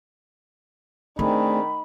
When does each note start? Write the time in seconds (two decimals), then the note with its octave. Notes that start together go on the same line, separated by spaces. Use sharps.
1.19 D#3 A3 C4 D4 G#4 B5